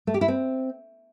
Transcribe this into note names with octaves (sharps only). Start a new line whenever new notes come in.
A3
G4
E4
C4